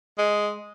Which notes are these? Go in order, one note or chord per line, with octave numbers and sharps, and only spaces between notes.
G#3